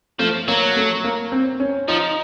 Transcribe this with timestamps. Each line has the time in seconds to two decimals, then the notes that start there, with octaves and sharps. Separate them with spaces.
0.19 F3 A3
0.48 F#3 A#3
0.76 A3
1.04 A#3
1.32 C4
1.60 C#4
1.88 F3 D#4